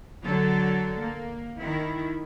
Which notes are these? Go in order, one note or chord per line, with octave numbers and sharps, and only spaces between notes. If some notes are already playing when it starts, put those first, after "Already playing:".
D3 F#3 A4
A#3
D#3 E4